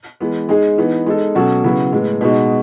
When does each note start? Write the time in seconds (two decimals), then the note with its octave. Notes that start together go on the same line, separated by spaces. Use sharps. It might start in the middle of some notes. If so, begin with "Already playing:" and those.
0.21 E3 G#3 B3
0.49 G#3 D#4 G#4
0.78 E3 B3 D#4
1.07 G#3 D#4 A4
1.35 B2 F#3 C#4 F#4 A4
1.64 C#3 F#3 B3 E4
1.92 A2 G#3 B3
2.21 B2 G#3 B3 D#4 F#4